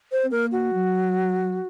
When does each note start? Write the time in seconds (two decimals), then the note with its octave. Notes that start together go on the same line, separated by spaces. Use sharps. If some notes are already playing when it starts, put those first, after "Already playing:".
0.12 C5
0.24 C4
0.31 A#3 A#4
0.52 F#4
0.73 F#3